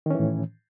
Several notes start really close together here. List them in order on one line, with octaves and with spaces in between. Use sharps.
D#3 C#4 E3 A2